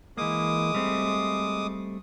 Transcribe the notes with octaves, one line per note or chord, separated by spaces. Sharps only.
E3 G#3 A#3 D6 D#6
G3 A3 C4